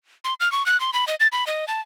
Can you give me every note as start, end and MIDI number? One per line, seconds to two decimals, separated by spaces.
0.24 0.34 84
0.40 0.51 89
0.52 0.65 85
0.66 0.79 90
0.80 0.91 84
0.93 1.05 83
1.08 1.15 75
1.20 1.27 93
1.32 1.45 83
1.47 1.65 75
1.68 1.81 81